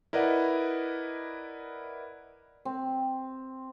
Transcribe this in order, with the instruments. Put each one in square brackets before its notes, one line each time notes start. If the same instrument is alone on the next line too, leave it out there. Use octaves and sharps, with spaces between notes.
[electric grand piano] E4 A#4 B4 D5 D#5 F#5
[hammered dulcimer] C4